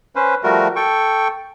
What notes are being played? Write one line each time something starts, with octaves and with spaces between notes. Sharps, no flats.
C#4 B4 C5
F3 G3 A3 F#4 A#4
A4 G5 C#6